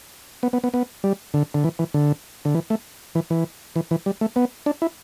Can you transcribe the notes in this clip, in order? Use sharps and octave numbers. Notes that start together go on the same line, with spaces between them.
B3
B3
B3
B3
G3
D3
D3
E3
E3
D3
D3
E3
A3
E3
E3
E3
E3
G3
A3
B3
D4
E4